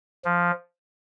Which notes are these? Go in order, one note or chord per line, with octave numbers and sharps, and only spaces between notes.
F3